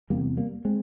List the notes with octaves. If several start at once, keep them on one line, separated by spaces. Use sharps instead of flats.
E2 C3 G3 A#3
G3 A#3
G#3 C4